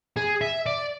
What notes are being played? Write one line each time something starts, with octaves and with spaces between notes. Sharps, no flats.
G#4
E5
D5